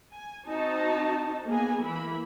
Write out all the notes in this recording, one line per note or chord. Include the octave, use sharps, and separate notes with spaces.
G#5
C4 D#4 F#4 A5
A#3 B3 G#4 G#5
E3 A#3 E4 B5